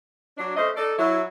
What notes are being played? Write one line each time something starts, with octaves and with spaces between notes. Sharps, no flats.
F#3 D4
A3 C#4 C5 D#5
D#4 A4 D5
F#3 E4